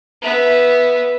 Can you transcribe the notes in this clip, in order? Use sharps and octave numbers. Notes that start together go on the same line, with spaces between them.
B3 E5